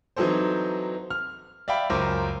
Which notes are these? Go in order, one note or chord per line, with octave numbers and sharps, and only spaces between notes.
E3 F#3 C4 D#4 A4 C5
F6
D5 E5 F5 G5 B5
C#2 F#2 A#4 C5 D6